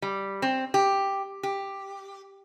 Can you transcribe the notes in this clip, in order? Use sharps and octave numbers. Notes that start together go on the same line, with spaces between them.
G3
C4
G4
G4